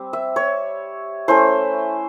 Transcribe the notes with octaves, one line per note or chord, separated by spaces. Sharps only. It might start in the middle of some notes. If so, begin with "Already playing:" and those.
Already playing: G3 C4
E5
C#5
A3 C#4 E4 C5